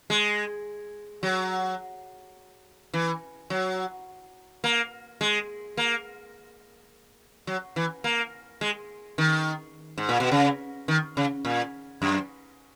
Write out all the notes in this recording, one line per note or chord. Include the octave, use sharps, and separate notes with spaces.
G#3
F#3
E3
F#3
A#3
G#3
A#3
F#3
E3
A#3
G#3
D#3
G#2
A#2
B2
C#3
D#3
C#3
A#2
F#2